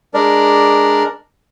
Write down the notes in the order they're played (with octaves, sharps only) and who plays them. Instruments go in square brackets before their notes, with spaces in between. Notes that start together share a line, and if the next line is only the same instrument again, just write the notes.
[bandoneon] G#3 D4 A#4 D5